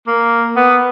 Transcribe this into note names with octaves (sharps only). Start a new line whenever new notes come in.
A#3
B3